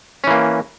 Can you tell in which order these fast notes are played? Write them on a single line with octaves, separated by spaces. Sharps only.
C#4 E3 A#3